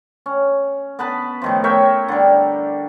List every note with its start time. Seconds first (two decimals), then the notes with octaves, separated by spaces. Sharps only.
0.26 C#4
0.99 B3 B4 A5 B5
1.42 A2 D#3 F3
1.64 A#4 C#5 E5 G5
2.08 D3 G3